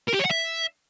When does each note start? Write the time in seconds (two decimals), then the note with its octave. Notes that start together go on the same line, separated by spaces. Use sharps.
0.09 A#4
0.14 G4
0.20 C#5
0.25 F#5
0.31 E5